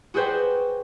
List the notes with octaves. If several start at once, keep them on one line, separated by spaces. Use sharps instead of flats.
F#4 G#4 B4 C5 D5 G5